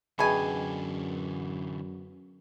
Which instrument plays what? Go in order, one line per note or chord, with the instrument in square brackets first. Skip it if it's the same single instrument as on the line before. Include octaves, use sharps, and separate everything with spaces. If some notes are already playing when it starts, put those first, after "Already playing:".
[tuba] F#2 [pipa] B2 G#5 [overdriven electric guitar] D3 E3 [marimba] G#4 D#5 G5